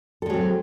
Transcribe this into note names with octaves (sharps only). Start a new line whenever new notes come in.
F#3 G#3 C4 A4